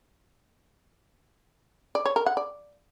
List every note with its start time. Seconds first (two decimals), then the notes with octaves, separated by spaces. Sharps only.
1.95 D5
2.05 C#5
2.16 A#4
2.26 F#5
2.37 D5